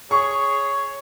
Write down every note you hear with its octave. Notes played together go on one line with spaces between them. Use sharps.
G#4 C#5 C#6